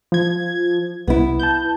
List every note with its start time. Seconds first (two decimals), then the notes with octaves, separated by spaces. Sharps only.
0.12 F3 G#6
1.07 C2 B3 E4
1.39 A5 G6